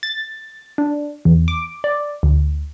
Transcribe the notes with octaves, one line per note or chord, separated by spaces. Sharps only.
A6
D4
E2
D6
D5
D2